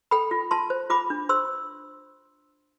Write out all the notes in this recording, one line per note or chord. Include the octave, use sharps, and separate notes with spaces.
A4 G5 B5
F4
F4 A5 C6
C5
F4 B5 D6
D4
C5 C6 E6